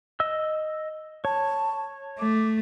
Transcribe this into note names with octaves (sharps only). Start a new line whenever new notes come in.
D#5 E6
C#5 A5
A3 D6